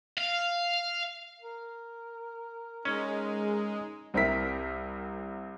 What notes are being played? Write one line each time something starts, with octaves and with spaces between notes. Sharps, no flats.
F5
A#4
G#3 C#4 D#4
C2 C4 E4 A#4 B6